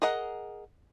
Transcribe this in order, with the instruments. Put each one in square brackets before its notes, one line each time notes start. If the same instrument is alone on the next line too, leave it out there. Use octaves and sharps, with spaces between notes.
[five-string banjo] G#4 A#4 D#5 F#5